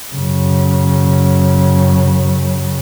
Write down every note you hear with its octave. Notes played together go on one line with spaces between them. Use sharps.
F#2 C#3